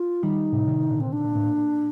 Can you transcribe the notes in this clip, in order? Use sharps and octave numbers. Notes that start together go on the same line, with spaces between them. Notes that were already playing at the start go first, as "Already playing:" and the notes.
Already playing: F4
D#3 G3 D#4
A2 C3
C3 D#3
A#2 D3
C4
D4
A#2
A2
A#2